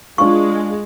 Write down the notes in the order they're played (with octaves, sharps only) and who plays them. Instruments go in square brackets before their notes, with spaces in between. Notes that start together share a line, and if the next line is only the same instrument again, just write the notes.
[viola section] G#3 [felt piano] D4 F4 F5 [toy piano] C#6